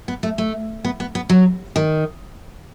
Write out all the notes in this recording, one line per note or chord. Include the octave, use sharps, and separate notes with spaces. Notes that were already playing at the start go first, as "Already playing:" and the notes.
B3
A3
A3
B3
B3
B3
F#3
D#3